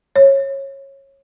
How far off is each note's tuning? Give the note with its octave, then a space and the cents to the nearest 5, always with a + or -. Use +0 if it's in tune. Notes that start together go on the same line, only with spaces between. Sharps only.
C#5 -20